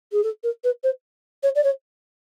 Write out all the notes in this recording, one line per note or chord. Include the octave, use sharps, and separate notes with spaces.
G#4
A4
A#4
B4
C5
C#5
D5
C#5